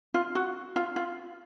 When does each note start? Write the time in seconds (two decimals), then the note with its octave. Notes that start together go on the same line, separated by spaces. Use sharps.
0.14 F4
0.35 F#4
0.76 F4
0.96 F4